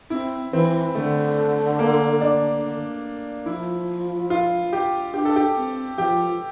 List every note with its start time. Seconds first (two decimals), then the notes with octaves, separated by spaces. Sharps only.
0.10 C4 E4
0.53 E3 C4
0.95 D3 A3
1.79 A#3
2.21 D4
3.46 F3 E4
4.30 F4
4.73 G4
5.14 D4 G4
5.25 A4
5.36 G4
5.56 C4
5.98 F3 G4